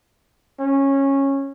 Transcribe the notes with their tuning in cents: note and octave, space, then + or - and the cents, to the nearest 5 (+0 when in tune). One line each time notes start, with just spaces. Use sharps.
C#4 -15